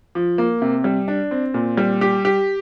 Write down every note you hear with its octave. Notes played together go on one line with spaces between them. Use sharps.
F3
A#3
C3
G3
D4
C4
A#2
G3
G4
G4